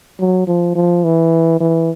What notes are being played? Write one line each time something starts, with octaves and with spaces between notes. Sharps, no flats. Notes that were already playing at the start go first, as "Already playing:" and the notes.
F#3
F3
F3
E3
E3